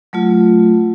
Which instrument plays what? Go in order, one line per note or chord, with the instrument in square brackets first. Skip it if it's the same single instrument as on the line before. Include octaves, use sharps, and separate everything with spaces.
[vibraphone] F#3 A3 F4